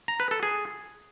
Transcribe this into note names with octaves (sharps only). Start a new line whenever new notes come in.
A#5
B4
A4
G#4